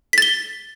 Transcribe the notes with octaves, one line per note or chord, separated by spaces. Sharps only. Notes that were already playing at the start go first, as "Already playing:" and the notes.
A6 B6 G7